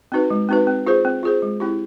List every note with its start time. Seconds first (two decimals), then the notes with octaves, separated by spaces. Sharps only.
0.12 C4 D#4 F#4 B4
0.30 G#3
0.49 C4 D#4 F#4 B4
0.67 C4
0.87 F4 G#4 C5
1.05 C4
1.23 F4 G#4 C5
1.42 G#3
1.60 C4 E4 G4